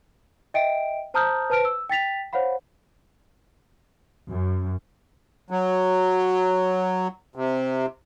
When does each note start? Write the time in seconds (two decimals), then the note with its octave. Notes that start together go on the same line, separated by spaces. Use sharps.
0.54 D#5 E5 G5 D7
1.14 C5 A5 A#5 D#6 F6 G6
1.50 B4 C5 A5 F6 D7
1.65 E6
1.90 G5 A6 B6 F7
2.33 C5 C#5 F5 F#5 B5
4.29 F#2
5.50 F#3
7.36 C3